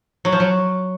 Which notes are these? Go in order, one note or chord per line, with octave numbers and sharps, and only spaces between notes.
F#3
F3
F#3